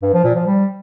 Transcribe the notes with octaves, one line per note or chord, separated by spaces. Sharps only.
G2
F3
A#2
F3
G3